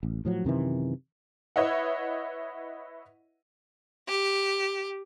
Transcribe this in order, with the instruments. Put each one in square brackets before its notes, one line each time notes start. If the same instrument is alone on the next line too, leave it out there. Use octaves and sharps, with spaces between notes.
[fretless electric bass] A1
A2 F3 F#3
F#2 C3 D#3 E3
[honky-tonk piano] E4 B4 C#5 D#5 E5 F#5
[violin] G4